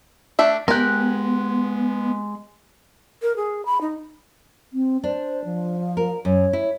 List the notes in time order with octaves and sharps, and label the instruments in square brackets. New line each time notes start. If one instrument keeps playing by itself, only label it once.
[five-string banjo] A3 D4 E5
[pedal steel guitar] G#3 F#6 [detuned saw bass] B3 [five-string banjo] G4 A#4
[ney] A#4
G#4
B5
D#4
[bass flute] C4
[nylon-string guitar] D4 [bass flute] C5
[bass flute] F3
[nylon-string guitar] A#4
[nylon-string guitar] F#2 [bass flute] C#5
[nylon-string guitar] E4